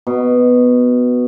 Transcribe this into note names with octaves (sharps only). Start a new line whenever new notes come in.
B2